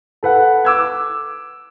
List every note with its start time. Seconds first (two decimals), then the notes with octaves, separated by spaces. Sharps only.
0.23 A4 B4 F#5
0.65 D6 E6 G#6